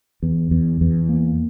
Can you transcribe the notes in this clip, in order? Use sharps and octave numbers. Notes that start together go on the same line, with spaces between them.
E2
E2
E2
A#3